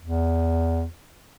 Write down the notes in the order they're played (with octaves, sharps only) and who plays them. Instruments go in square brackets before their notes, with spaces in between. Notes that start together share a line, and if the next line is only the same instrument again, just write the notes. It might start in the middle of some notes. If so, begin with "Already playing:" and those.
[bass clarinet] E2